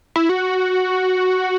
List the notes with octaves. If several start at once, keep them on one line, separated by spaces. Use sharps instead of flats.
E4
F#4